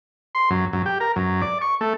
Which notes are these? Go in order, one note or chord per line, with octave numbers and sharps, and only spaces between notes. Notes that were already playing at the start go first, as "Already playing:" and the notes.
C6
F#2
F#2
G4
A#4
F#2
D5
C#6
A3